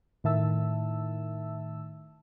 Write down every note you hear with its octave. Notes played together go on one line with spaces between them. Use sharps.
A2 D#3 E5 A5 E6